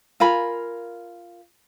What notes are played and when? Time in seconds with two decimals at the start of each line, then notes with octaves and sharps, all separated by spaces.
0.20 F4 A#4 G#5 B5